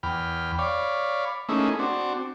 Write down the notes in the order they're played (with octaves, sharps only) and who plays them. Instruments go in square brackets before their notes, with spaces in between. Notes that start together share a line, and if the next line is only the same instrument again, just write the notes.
[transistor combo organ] E2 G5 B5 F6
C#5 D5 F5 B5
A3 A#3 C#4 D#4 E4 G#4
C4 D4 F#4